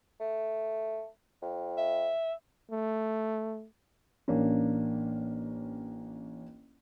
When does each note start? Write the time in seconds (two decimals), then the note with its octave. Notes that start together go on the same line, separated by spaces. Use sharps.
0.20 A3
1.42 F2
1.78 E5
2.70 A3
4.28 A1 A#3 C#4 D4